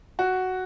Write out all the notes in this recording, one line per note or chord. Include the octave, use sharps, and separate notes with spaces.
F#4